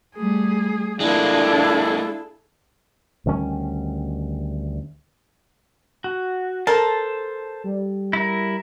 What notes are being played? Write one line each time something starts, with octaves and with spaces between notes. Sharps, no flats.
G3 A3 G#4
G#3 A#3 D4 E4 F4 G#4 A4
D2 D#3 G3 C#4
F#4
A4 A#4 C5 A5
G3
E4 A#4